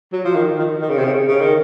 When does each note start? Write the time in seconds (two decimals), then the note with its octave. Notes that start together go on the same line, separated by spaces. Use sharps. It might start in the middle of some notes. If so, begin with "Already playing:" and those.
0.13 F#3
0.24 F3
0.36 D#3
0.59 D#3
0.81 D#3
0.89 C#3
0.97 C3
1.05 C#3
1.28 C#3
1.41 D#3